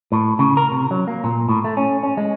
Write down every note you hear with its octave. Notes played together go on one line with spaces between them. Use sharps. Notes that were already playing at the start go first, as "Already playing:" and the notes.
A2
C#3
A#4
C3
F#3
A#3
A#2
A2
A3
C#4
C#4
G#3